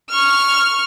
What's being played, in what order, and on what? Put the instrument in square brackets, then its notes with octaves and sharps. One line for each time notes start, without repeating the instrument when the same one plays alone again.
[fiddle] C#6 F6